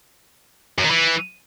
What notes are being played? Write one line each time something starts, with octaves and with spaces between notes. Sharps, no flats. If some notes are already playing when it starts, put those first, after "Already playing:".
F#2
D#3
E3